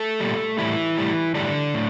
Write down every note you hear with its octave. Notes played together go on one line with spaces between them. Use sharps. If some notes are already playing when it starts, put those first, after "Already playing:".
Already playing: A3 A4
A#2 G3
A2 E3 G3 E4
A2 G3
A2 D3 E3 G3 D4
A2